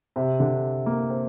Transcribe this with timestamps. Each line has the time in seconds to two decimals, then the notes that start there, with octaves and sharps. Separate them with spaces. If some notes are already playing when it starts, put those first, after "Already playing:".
0.16 C3
0.40 D3
0.86 A#3
1.10 C4